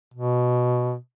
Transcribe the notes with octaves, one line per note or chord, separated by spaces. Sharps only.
B2